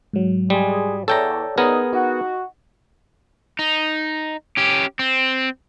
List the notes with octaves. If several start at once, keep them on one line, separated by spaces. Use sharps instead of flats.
G#2 F#3
G3 G#3 G#4
E2 A4 C#5 D5 G5 A#5
B3 D#4 G#4 A#4
D#4 F#4 D#5
D#4
C#4 G4
C4